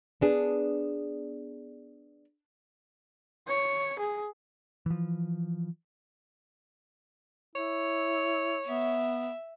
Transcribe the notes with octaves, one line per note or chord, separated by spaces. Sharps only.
B3 D4 G#4
C#5
G#4
E3 F3
E4 C#5
B3 E5